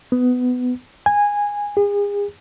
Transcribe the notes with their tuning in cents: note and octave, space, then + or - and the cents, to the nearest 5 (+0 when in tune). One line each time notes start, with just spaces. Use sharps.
B3 +15
G#5 -15
G#4 -35